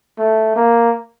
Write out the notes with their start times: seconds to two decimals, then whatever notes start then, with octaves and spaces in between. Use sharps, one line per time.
0.19 A3
0.56 A#3